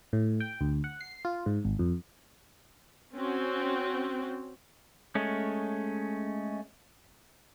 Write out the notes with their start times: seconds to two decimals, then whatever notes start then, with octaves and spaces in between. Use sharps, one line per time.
0.13 A2
0.40 G5
0.61 D2
0.84 F#5
1.01 C7
1.25 F4
1.46 G#2
1.65 G#1
1.79 F2
3.15 C4 C#4 F#4
5.15 G#3 A3 C#4